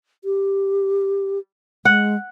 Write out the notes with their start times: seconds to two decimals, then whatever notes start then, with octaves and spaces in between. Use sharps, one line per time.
0.24 G4
1.85 G#3 F#5